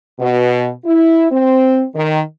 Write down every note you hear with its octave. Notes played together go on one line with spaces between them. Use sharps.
B2
E4
C4
D#3